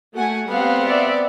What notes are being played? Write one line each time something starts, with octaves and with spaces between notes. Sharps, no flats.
A3 F#4 F#5 G#5
G3 B3 C4 F5 F#5
D5 E5